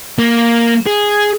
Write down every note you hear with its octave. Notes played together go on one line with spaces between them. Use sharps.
A#3
G#4